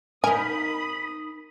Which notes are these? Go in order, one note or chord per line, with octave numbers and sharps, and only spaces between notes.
D#4 A#4 G#5 B5 D#6